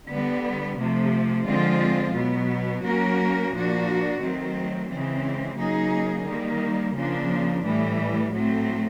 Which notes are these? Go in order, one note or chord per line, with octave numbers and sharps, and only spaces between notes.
D3 G3 B3
C3 F3 A3
D3 F3 G#3 C4 F4
B2 F#3 B3
F#3 A#3 C#4 F#4 A#4
A#2 F3 A#3 D4 F#4
D#3 F#3 A3 C4
C#3 E3 G#3 C4
C#3 F#3 A#3 D#4 G#4
D#3 G3 A#3
C#3 F3 A#3 D4
A2 E3 G3
A2 F#3 A3 C4